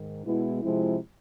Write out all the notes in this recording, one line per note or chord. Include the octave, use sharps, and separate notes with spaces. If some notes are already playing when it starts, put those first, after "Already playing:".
Already playing: G#2 D#3
B2 G#3 B3 E4
C3 F3 G#3 C4 E4